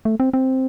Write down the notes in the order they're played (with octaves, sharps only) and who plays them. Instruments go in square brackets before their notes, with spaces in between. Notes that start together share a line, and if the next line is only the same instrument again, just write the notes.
[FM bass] A3
C4
C4